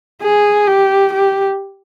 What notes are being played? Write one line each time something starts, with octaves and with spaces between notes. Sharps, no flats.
G#4
G4
G4